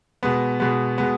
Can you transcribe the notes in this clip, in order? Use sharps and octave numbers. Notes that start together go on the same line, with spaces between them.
B2 G#3 B3
B2 G#3 B3
B2 G#3 B3